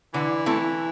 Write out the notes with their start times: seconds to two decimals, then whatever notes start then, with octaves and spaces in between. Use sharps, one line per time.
0.14 D3 E3
0.46 A3 C4 E4 A4